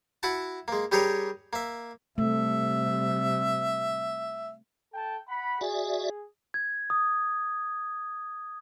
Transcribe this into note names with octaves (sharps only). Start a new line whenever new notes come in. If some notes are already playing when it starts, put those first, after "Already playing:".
E4 F#4 F#5 A5
G#3 A#3
G3 C#4 G4 G#4 A#4 C#5
A#3 E5
C3 G3 A3 E5
A4 G5 A5
F#5 B5
F#4 G#4 D5 E5
G#6
D#6